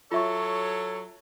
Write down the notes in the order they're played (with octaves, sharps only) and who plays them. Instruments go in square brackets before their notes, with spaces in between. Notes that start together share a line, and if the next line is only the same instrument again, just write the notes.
[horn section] F#3 A4 C#5 [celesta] F4 E5 C#6